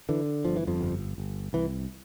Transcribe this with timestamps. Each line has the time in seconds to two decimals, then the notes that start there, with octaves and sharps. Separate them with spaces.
0.09 D3 E3
0.45 G1 F3
0.56 E3
0.67 F2 F3
0.81 G1
1.18 G1
1.53 C2 E3